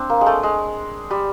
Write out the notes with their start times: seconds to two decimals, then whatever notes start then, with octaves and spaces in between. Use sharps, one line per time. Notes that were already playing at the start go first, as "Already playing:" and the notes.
Already playing: C4 D4
0.10 A#3
0.21 G#3
0.26 A3
0.43 G#3
1.11 G3